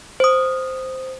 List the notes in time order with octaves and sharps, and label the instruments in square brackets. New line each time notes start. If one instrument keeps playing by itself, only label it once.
[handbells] C5 D#6